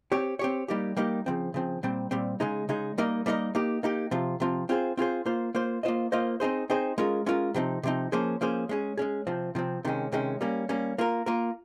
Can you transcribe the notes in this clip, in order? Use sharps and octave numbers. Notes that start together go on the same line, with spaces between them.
C4 G4 C#5
C4 G4 C#5
G3 A#3 D#4 G4
G3 A#3 D#4 G4
C#3 F3 C4
C#3 F3 C4
A#2 G3 C4
A#2 G3 C4
C#3 G#3 D#4 G#4
C#3 G#3 D#4 G#4
G3 A#3 D#4 A#4 D#5
G3 A#3 D#4 A#4 D#5
A#3 D#4 G4
A#3 D#4 G4
C3 F3 C4 F4
C3 F3 C4 F4
C4 F4 G#4 C5
C4 F4 G#4 C5
A#3 F4 C5
A#3 F4 C5
A#3 F4 C5 D#5
A#3 F4 C5 D#5
C4 D#4 G#4 C5
C4 D#4 G#4 C5
G#3 C#4 F4 A#4
G#3 C#4 F4 A#4
C3 F3 C4 D#4
C3 F3 C4 D#4
F3 A#3 C#4 G#4 C5
F3 A#3 C#4 G#4 C5
G#3 C#4 G#4
G#3 C#4 G#4
C3 F3 C4
C3 F3 C4
C3 D#3 G#3 C#4
C3 D#3 G#3 C#4
G3 A#3 C#4
G3 A#3 C#4
A#3 F4 A#4
A#3 F4 A#4